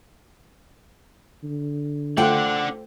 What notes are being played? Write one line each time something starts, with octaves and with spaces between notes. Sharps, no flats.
D3
A3 D4 F4 A4 C5 F#5 G5